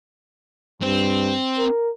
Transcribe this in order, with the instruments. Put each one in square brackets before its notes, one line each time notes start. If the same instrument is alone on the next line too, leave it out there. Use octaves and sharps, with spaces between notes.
[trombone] G2 [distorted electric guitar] C4
[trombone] A#4